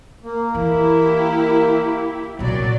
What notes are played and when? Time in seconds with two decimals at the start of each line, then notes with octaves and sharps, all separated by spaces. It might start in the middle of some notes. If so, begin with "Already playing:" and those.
0.24 A#3
0.55 E3 E4 G4
2.39 C2 A#2 F#3 D5